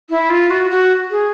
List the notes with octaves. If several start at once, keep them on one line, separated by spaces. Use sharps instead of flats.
E4
F4
F#4
F#4
G#4